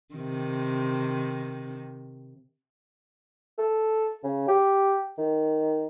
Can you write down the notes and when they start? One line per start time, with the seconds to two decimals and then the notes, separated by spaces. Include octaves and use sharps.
0.14 C3 D#3
3.58 A4
4.24 C#3
4.48 G4
5.18 D#3